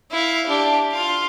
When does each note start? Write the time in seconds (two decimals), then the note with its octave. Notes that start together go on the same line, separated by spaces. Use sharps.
0.11 E4 F5
0.46 D4 G4
0.92 F4 F5